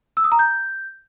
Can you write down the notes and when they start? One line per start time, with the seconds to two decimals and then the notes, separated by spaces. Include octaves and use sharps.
0.17 E6
0.24 D#6
0.32 A#5
0.39 G6